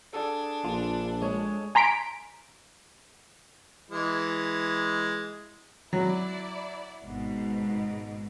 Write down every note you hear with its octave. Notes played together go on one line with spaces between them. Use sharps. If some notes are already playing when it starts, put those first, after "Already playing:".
D4 G#4 A4
A#1 F4
G#3 C#5
G#5 A#5 C6 B6 D7
E3 G#3
F#3 E4 D5
G#1 G#2 B2